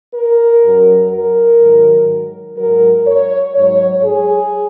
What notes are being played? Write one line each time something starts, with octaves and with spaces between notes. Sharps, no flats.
A#4
F#2 F#3
A#4
G#2 D#3 F#3
G#2 F#3 A#4
C#5
G#2 F#3 C#5
G#4